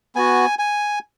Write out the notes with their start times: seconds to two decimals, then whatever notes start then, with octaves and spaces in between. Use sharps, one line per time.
0.15 B3 F#4 G#5
0.59 G#5